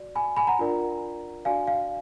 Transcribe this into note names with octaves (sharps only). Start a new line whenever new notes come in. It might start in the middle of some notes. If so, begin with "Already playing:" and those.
Already playing: F#4 D5
G#5 B5
G#5 B5
F#5 A#5
D4 F4 A#4 D5
D4 F#4 D5 F5 G#5
F5